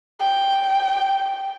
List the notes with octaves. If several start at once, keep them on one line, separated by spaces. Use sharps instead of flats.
G5